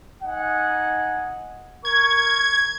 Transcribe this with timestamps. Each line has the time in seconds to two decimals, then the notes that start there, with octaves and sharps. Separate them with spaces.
0.23 D#4 F#5 G#5
1.85 A#4 C#6 G#6